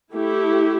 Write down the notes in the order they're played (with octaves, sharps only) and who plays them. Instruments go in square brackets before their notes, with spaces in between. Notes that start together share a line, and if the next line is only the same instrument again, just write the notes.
[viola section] A3 E4 G4